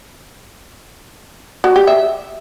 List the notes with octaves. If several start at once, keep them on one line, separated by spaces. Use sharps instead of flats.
F#4
G4
E5